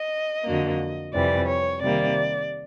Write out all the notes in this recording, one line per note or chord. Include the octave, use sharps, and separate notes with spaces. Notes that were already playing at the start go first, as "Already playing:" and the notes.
Already playing: D#5
F2 D3 F#3 A#3
F2 C3 E3 G3 D5
C#5
C3 D#3 G3 A#3 D5